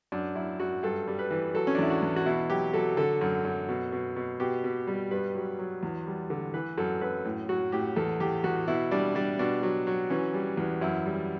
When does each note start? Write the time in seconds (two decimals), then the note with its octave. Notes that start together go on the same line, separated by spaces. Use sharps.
0.12 F#2 D4
0.35 F#2 E4
0.59 F#2 F#4
0.83 G2 A4
1.08 G3
1.19 B4
1.31 E3
1.55 F#3 A4
1.67 C#4
1.75 D4
1.79 E2 E4
1.90 F#4
2.02 E2
2.16 F#4
2.26 B2 E4
2.50 F#3 G4
2.73 F#3 A4
2.97 D3 A4
3.21 F#2
3.45 F#2
3.69 B2
3.92 B2
4.16 B2
4.40 B2 G4
4.64 B2
4.87 G3
5.11 G2 B4
5.35 F#3
5.59 F#3
5.83 E2
6.07 G3
6.30 D3
6.54 E3 B4
6.78 F#2 A4
7.01 F#2 B4
7.25 A2
7.49 F#3 F#4
7.72 A2 G4
7.96 E2 A4
8.20 E2 G4
8.44 E2 F#4
8.68 B2 E4
8.91 G3 D4
9.15 G3 D4
9.39 B2 D4
9.63 F#3
9.87 F#3
10.10 E3 C#4
10.34 G3
10.57 E2
10.81 F#2 E4
11.06 G3